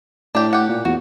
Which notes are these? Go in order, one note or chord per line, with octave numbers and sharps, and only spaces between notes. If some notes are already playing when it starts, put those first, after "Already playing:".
A2 D4 G4
G4 F#5
A#2
E2 F#4